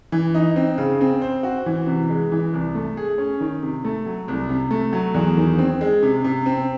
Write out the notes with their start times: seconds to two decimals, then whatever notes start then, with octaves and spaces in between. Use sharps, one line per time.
0.12 E3
0.34 D#4
0.56 C4
0.78 C#3
1.01 C4
1.21 C5
1.43 F#4
1.66 E3
1.87 C3
2.10 G#3
2.32 E3
2.54 C2
2.75 A3
2.97 G#4
3.18 C#4
3.41 D#3
3.62 C3
3.85 A3
4.06 F#3
4.28 C2
4.49 C3
4.71 A3
4.93 F#3
5.14 E2
5.37 D#3
5.58 C4
5.81 G#3
6.03 C3
6.24 C3
6.46 C4